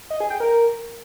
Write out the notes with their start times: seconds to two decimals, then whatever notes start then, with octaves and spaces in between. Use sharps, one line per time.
0.10 D#5
0.20 G#4
0.30 G5
0.40 A#4